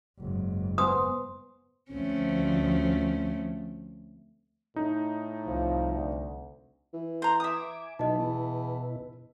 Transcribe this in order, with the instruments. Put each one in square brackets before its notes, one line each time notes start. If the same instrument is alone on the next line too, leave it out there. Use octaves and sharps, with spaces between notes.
[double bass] F#1 G#2
[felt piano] B3 [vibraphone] C5 G#5 C6 [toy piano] D#6
[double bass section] D2 F3 [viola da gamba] A3 C4 C#4
[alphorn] A2 [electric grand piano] D#4
[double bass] C2 [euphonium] F3
[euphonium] D2
[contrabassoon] E3
[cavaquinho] C5 A#5
[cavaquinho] E5 D#6 [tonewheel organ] G#5 D6
[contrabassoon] B1 [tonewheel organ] B2 E4 B4 [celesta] D#5 A5
[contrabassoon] E2